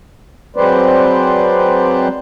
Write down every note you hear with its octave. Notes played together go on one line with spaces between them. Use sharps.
F#3 G#3 C4 B4 C5 D5